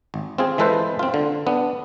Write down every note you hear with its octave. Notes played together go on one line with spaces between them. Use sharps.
G#1
C4 F4 G#4
E3 G#3 A4 B4 C5
C4 F4
D3
B3 D4